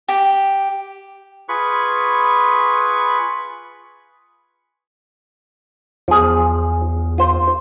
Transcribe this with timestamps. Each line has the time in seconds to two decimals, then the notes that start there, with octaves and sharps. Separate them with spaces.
0.08 G4
1.49 F4 G#4 B4 B5 C#6
6.08 E2 F3 G#4
7.18 F4 C5